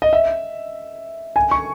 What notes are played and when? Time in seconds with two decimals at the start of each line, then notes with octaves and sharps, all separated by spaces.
0.02 D#5
0.13 E5
1.36 G#5
1.51 C#6